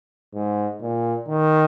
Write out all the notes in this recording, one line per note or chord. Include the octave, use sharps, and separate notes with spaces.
G#2
A#2
D#3